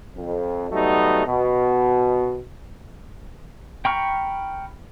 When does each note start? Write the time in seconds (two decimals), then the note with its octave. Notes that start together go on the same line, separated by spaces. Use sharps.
0.16 F2
0.71 F#3 G3 A3 B3 D#4
1.27 B2
3.85 G5 A#5 B5 C#6 F6